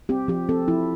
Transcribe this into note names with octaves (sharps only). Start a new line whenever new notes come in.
C4 G4
F3 G4
C4 A4
F3 E4